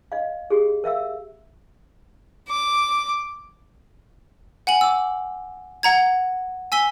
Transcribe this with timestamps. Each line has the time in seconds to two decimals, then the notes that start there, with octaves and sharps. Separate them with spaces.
0.12 D#5 F5
0.50 G4 G#4
0.84 A#4 E5 F5 E6
2.49 D6
4.67 F#5 G#5 F#7
4.81 D6 E6
5.83 F#5 A#5 G#6
6.72 G#5 E6 B6 G7